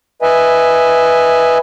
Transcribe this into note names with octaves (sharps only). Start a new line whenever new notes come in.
B4 D#5 E5 G#5